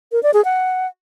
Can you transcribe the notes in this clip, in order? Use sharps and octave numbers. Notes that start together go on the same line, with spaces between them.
A#4
D5
G#4
F#5